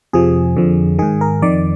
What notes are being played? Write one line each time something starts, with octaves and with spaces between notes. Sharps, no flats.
F2 C3 F3 G#4
F2 D3 F3
G#2 D#3 G#4
A#4
F2 D#3 D5